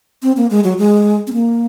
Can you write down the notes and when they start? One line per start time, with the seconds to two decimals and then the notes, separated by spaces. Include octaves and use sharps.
0.23 C4
0.37 A#3
0.50 G#3
0.64 F#3
0.78 G#3
1.27 C4
1.33 A#3